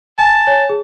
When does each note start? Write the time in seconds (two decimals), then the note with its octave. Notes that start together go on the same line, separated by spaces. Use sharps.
0.19 G#5 A5
0.47 C#5 G#5
0.69 G#4